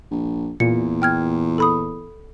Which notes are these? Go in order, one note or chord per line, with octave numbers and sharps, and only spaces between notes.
A#1
E2 A#2 C#7
G5 F6 G#6
A4 B5 D#6